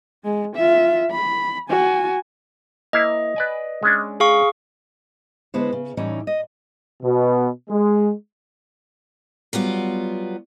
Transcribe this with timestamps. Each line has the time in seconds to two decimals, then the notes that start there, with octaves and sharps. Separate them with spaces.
0.24 G#3
0.56 F4 E5
1.11 B5
1.70 F#4 G#5
2.93 A#3 E4 C5 D#5
3.36 B4 D5 G#5
3.83 G#3 C#4 D4
4.20 G#4 F5 C#6
5.54 D3 G#3 B3 E4 C5
5.72 C#3
5.97 A2 E3 G3 C#4 D#4
6.27 D#5
7.02 B2
7.69 G#3
9.53 F#3 G3 B3 F4